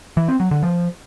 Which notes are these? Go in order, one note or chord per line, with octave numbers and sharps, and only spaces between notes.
E3
C4
F#3
D3
F3